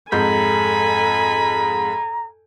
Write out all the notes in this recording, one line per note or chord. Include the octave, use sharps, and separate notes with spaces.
F2 G#2 A4 G#5 A#5 B5 G6